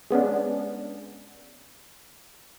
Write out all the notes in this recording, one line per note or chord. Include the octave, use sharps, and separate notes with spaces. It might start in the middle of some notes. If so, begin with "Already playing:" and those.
G#3 B3 C#4 D4